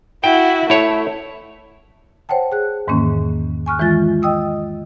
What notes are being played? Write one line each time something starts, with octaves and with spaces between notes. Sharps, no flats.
E4 F#4 G5
A3 E4 C#5
C5 C#5 F#5 G5 A5
G#4 F#6
E2 G#2 D#3 E3 A#3 C#4
G#5 C#6 F6 F#6
D#3 E3 G#3 F4 A6
D#5 G5 D#6 E6